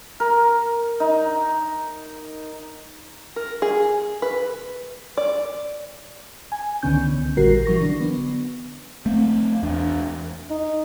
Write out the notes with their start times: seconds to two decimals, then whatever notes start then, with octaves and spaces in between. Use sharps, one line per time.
0.20 A#4
1.00 D#4
3.36 A#4
3.62 G#4
4.22 B4
5.17 D5
6.52 G#5
6.83 C#2 D3 D#3 B3 C#4 G6
7.37 A1 A#2 G3 F#4 A#4 C7
7.66 E3 F#3 C#6 A#6
7.80 D3 D4
8.01 B3
9.06 A3 C4
9.63 E2 D4
10.50 D#4